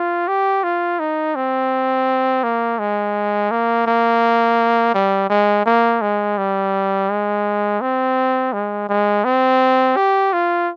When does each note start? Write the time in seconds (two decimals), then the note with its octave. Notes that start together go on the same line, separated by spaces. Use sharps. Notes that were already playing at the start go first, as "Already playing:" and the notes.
Already playing: F4
0.28 G4
0.63 F4
0.99 D#4
1.35 C4
2.43 A#3
2.79 G#3
3.51 A#3
3.86 A#3
4.94 G3
5.30 G#3
5.66 A#3
6.01 G#3
6.37 G3
7.10 G#3
7.81 C4
8.53 G#3
8.89 G#3
9.24 C4
9.96 G4
10.33 F4